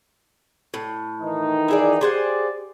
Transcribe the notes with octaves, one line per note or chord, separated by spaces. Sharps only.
A2
D#3 E3 D#4
E4 G#4 D5
G4 G#4 C5 D5 F#5